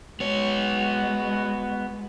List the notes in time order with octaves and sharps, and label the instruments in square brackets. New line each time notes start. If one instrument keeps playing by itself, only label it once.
[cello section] G#3 [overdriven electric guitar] B3 C#5 [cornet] F#4